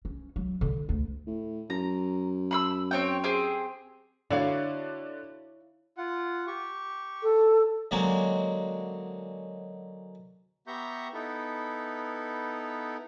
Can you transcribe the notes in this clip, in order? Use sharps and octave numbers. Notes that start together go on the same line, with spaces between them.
C#4
F#3
D3
D2
A2
F#2 A#5
B5 C6 E6
C4 C#5 G5
C4 G4 G#4
D3 E4 F#4 C#5 D5 F5
F4 F#5
G4 C#6
A4
D3 F#3 G#3 A#3 C4 C#4
B3 G4 E5 A#5 C#6 G6
B3 D#4 E4 A4 B4